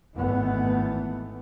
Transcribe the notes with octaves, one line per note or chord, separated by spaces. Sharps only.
G#1 E3 A3 B3